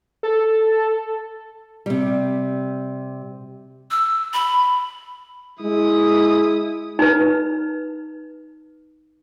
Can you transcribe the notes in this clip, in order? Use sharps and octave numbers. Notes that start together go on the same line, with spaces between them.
A4
C3 G3
E6
B5
G#3 E4 D#6
D#4 B4